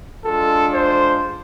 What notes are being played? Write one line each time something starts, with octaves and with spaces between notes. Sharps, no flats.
G#3 D4 F4 A4
C5